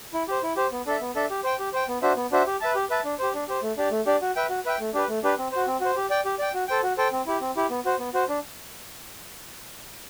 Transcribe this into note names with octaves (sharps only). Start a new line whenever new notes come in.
E4
G4 C5
E4
G4 C5
B3
D4 A4 E5
B3
D4 A4 E5
G4
C5 G5
G4
C5 G5
B3
D4 F#4 C5 E5
B3
D4 F#4 C5 E5
G4
B4 E5 A5
G4
B4 E5 A5
D4
G4 C5
D4
G4 C5
A3
D4 G4 D5
A3
D4 G4 D5
F#4
B4 E5 G5
F#4
B4 E5 G5
A3
D4 G4 B4
A3
D4 G4 B4
C4
F#4 C5
C4
F#4 C5
G4
D5 G5
G4
D5 G5
F#4
A4 C5 G5
F#4
A4 C5 G5
C4
E4 G4
C4
E4 G4
B3
F#4 C5
B3
F#4 C5
D4